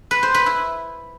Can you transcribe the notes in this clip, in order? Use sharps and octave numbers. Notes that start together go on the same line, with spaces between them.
B4
C5
B4
E4